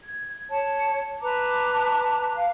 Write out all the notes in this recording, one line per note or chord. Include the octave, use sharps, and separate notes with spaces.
G#6
C#5 A5
B4 A5 A#5 D6
F5